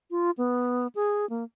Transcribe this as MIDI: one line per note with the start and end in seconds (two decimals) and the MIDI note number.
0.11 0.31 65
0.38 0.87 59
0.95 1.28 68
1.30 1.44 58